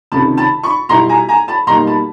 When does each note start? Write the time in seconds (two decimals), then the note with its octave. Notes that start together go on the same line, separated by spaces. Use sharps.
0.12 C#2 C3 D#3 A5 B5
0.37 A5 B5
0.63 B5 C#6
0.89 B2 G3 B3 E4 A#5 C6
1.09 G#5 A#5
1.29 G#5 A#5
1.48 A5 B5
1.67 B2 G3 A#3 D#4 A#5 C6
1.87 A5 B5